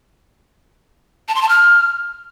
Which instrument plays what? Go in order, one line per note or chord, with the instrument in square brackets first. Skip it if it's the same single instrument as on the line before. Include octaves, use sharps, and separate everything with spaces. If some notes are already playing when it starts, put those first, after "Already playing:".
[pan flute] A5
C6
A5
F6